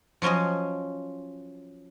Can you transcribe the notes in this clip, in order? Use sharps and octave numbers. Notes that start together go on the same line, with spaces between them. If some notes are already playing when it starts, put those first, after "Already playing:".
F3 F#3 C#4 C5 D#5